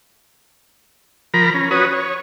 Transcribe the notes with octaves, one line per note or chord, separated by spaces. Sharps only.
F3 A#4 A#5 B5
C#4
F#4 B4 C#5 D#6
C#5